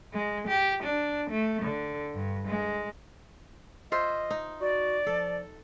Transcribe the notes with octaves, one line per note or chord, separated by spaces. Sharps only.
G#3
G4
D4
A3
D3
G2
G#3
F4 C5 D#5 E5
D#4
F#4 D5
F3 A4